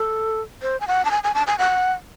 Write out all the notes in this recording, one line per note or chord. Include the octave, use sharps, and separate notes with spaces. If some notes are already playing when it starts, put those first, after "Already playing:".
Already playing: A4
C5
G#5
F#5
A5
G#5
G#5
A5
G#5
F#5